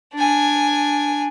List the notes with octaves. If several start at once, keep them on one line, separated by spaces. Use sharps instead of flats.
D4 G#5